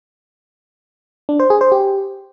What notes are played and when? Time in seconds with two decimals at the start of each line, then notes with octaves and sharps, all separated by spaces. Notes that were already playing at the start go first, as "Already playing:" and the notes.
1.29 D4
1.40 C5
1.50 G#4
1.61 C5
1.72 G4